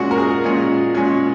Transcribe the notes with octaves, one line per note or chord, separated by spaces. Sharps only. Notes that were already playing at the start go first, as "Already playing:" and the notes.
Already playing: A#2 G#3 C#4 F#4
A#4
G#4
A#2 G#3 C#4
A#2 G#3 C#4